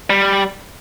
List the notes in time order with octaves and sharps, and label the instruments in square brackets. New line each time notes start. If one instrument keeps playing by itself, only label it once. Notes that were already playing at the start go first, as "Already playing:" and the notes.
[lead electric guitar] G3